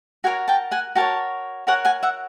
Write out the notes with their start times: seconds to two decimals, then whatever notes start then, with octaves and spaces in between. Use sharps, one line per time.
0.24 F#4 A#4 C#5 F#5 G#5
0.48 G5 A5
0.71 F#5 G#5
0.95 F#4 A#4 C#5 G5 A5
1.67 F#4 A#4 C#5 F#5 G#5
1.85 F#5 G#5
2.03 E5 F#5